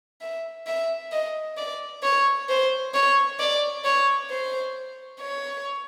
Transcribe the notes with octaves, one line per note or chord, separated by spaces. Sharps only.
E5
E5
D#5
D5
C#5
C5
C#5
D5
C#5
C5
C#5